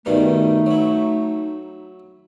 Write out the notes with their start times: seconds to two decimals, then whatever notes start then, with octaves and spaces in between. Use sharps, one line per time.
0.06 G2 B2 D#3 A3 D#4
0.66 F#3 E4